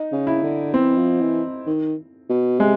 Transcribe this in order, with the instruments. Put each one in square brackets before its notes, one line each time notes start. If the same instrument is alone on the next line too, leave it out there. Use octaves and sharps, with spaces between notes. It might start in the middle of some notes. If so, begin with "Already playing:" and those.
Already playing: [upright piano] D#4
[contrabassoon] C#3
[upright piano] E4
[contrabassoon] D3
[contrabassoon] E3 [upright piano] C4
[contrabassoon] F3
E3
D#3
B2
[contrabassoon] C3 [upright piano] G#3